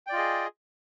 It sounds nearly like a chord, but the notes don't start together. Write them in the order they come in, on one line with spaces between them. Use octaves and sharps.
G5 D5 F4 D#5 G#4